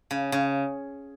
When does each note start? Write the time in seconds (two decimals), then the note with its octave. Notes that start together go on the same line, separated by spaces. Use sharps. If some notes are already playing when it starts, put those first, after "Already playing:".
0.11 C#3
0.32 C#3